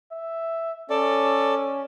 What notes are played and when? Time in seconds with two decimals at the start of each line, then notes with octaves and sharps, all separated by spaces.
0.12 E5
0.90 C#4 A4 D5